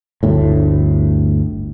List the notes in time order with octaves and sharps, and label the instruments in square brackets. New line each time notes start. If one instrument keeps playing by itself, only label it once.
[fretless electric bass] G1 D2 A2